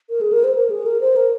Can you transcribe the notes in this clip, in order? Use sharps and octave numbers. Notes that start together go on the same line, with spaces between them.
A#4
G#4
A#4
C5
A#4
G#4
A#4
C5
A#4